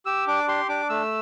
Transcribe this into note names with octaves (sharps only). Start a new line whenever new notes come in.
G4 E6
D4 D6
G4 C6
D4 D6
A3 E6